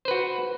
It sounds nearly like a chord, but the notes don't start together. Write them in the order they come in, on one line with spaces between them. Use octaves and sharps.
C5 B4 F#4